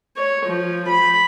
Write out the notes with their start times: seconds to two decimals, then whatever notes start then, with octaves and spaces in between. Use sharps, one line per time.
0.16 C#5
0.45 F3
0.89 B5